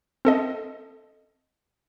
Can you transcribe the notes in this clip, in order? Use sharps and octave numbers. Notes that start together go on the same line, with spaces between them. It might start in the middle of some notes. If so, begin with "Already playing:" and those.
C4 A4 D#5